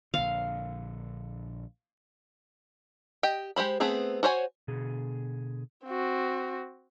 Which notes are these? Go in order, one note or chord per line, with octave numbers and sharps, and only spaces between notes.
A#1 D3 F5
G4 D#5 G5
G#3 G4 C5 B5
A3 B3 C4 G#4
F#4 C5 C#5 G#5
B2 D3 G#4
C4 F#4